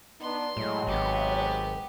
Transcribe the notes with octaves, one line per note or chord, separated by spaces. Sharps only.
B3 D4 D#4 C6
A2 F#3 G#3
G#1 B3 G4